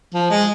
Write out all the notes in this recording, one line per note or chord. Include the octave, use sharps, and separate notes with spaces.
F3
G#3